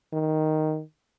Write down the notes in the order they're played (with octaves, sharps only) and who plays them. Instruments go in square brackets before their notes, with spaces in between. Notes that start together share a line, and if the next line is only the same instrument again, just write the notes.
[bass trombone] D#3